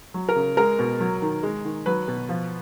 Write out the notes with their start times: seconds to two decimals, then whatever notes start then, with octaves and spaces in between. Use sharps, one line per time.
0.14 F#3
0.29 A#4
0.36 C#3
0.57 G#3 A#4
0.79 B2
1.00 F#3
1.22 D#3
1.43 G#3
1.65 D#3
1.86 F#3 B4
2.08 B2
2.29 F3